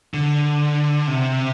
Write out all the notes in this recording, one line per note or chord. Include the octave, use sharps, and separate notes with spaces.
D3
C3